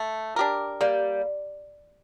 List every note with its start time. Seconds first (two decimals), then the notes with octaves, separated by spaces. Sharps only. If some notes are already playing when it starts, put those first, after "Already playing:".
Already playing: A3
0.36 D4 G4 A#4
0.81 G3 A#3